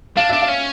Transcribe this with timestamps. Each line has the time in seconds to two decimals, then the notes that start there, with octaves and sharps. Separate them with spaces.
0.17 D4 F5
0.29 D4 E5
0.42 F5
0.48 C#4